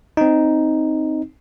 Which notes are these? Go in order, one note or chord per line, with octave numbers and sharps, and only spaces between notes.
C4 D#4